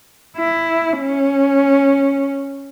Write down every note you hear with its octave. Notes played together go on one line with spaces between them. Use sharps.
E4
C#4